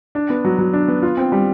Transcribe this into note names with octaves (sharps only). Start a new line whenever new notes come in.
D4
B3
F#3
F#3
D4
B3
F4
C4
G3